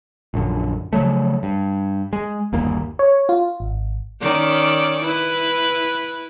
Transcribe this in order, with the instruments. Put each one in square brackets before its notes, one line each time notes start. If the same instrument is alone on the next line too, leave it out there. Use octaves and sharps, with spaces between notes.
[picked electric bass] A#1 F#2 D3
C#3 F3 F#3 A3
G2
G#3
G1 D#2 A#3
[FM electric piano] C#5
F4
G#1
[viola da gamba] D#3 C#4 D5
E4 B4